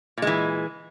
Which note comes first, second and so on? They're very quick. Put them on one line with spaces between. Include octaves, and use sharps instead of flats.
A#2 G#3 E3